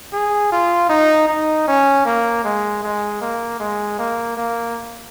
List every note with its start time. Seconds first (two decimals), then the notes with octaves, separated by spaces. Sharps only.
0.13 G#4
0.52 F4
0.89 D#4
1.28 D#4
1.67 C#4
2.05 A#3
2.44 G#3
2.83 G#3
3.21 A#3
3.60 G#3
3.99 A#3
4.37 A#3